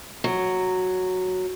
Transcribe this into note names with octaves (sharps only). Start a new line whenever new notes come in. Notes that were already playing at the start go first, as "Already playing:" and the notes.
F#3